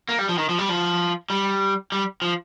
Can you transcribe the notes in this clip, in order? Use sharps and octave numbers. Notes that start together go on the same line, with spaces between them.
A#3
G3
F3
D#3
F3
G3
F3
G3
G3
F3